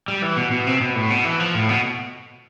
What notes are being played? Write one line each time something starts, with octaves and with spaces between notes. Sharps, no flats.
G3
E3
B2
B2
C3
B2
A2
B2
E3
F3
A2
B2